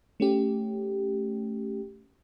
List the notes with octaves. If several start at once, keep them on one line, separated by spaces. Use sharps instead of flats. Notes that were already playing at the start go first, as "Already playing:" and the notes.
A3 C#4 G4